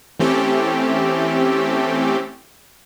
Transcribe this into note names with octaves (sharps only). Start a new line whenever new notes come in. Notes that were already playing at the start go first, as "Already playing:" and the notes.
E3 A3 C4 C#4 G4 A4